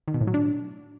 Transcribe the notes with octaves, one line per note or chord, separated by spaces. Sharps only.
D#3
B2
A2
F#3
D4